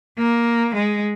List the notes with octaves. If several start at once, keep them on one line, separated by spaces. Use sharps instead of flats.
A#3
G#3